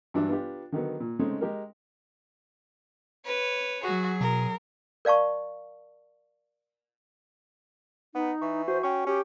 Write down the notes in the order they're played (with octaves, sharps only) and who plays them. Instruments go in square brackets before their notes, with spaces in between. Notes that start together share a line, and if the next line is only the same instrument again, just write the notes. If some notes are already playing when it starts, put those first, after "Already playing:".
[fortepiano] G2 E3 F#3 D4 E4
B3 D4 F4 G4
D3 D#3 F#3 B3
A#2
C#3 G#3 A3 C4 C#4 D#4
G#3 G4 A#4
[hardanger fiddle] B4 C#5
[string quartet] F#3 [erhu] F#4 [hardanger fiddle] G#4
[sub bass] B2 [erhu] A#4
[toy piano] A#4 D5 F5 A5 C#6
[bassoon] B3 [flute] D#4
[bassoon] E3 [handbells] C#6
[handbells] F#4 [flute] C5
[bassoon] C#4 [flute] G5 [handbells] C#6
[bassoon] C#4 [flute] G4